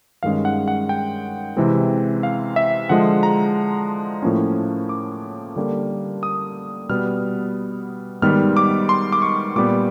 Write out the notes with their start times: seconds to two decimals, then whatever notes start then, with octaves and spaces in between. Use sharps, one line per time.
0.23 G2 D#3 G#3 C#4 F5
0.45 F#5
0.68 F#5
0.89 G5
1.57 C3 E3 G#3 C4
2.23 F5
2.56 E5
2.89 D3 F3 G#3 F#5
3.23 A#5
4.22 A2 F3 A#3 C#4
4.89 D6
5.56 D3 G3 A#3
6.23 D#6
6.89 B2 G3 B3 F6
8.22 G#2 D#3 G3 B3 F6
8.57 D6
8.89 C6
9.12 D6
9.22 C#6
9.56 A#2 G3 B3 D6